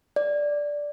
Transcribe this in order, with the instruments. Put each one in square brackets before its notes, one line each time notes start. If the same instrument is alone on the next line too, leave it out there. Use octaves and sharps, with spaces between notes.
[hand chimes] D5